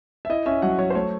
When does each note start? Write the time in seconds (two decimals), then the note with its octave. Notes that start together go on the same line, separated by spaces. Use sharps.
0.25 E5
0.30 E4 D#5
0.46 C#4 E5
0.62 F#3 F#5
0.78 F#3 C#5
0.90 C5
0.95 A3 C#5